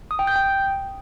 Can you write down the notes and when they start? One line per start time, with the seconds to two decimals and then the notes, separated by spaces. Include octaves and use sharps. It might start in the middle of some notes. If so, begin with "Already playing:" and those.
0.11 D#6
0.19 G5
0.27 G6
0.36 G5